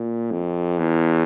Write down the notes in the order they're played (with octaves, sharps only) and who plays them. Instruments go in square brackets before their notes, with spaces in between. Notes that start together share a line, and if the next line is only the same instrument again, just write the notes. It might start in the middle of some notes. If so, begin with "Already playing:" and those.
Already playing: [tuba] A#2
F2
E2